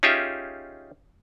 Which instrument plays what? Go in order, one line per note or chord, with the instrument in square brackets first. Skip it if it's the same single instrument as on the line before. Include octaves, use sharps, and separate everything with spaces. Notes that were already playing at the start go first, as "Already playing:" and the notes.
[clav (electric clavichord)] C#4 D#4 F4 G4 G#4 E5